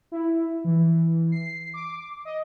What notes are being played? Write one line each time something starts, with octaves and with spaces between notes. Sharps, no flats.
E4
E3
C7
D6
D#5